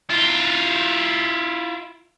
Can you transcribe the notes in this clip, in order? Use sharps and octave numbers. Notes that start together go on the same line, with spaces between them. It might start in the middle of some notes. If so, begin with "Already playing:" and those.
E4 F4